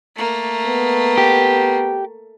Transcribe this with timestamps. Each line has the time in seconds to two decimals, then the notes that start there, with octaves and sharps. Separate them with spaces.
0.16 A3 A#3
0.67 B3
1.18 G4